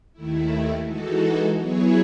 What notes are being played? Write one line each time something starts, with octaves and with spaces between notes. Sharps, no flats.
D#2 D#3 A3 E4
E3 G#3 D#4 F#4 A4
F#3 B3 E4 G#4 C#5